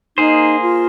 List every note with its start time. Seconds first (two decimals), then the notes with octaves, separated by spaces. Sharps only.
0.17 A#3 D#4 G#4 C5
0.62 F4